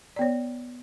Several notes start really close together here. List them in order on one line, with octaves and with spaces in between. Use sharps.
D5 B3 C#5